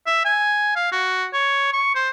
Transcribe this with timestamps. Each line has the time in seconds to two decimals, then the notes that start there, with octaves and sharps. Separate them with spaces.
0.07 E5
0.25 G#5
0.76 F5
0.92 F#4
1.33 C#5
1.73 C#6
1.95 C5